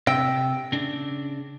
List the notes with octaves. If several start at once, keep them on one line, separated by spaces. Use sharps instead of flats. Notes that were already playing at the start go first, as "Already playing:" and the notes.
C3 E5 G5
C#3 D4